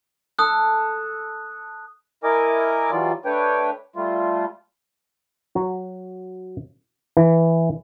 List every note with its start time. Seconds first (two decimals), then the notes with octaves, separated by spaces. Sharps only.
0.39 A4 D#6 F#6
2.24 E4 A#4 D#5 G#5 D6
2.91 E3 F#3 G3 F4 D5
3.25 A3 D4 B4 C#5 G5
3.96 G3 A3 F4
5.55 F#3 F#4
7.17 E3